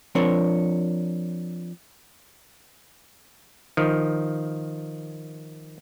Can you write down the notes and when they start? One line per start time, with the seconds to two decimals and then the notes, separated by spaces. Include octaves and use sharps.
0.15 F3 C4 D4 A#4 C#5
3.77 D#3 F3